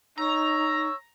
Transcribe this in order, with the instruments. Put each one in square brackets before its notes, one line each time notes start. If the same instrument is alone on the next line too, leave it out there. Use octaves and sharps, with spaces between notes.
[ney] D#4 [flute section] C#5 C#6 E6 [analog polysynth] A#5